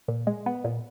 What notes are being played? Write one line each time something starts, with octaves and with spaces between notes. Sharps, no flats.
A#2
G#3
B3
A#2